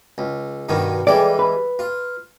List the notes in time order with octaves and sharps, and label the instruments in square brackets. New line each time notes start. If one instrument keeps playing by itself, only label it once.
[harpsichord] C#2
G2 B2 D#3
[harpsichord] E3 G3 G#3 [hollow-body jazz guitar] A4 D5
[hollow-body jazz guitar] B4
[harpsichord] F4